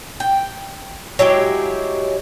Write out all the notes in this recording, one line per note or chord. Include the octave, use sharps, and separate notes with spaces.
G5
F#3 G#3 E4 G4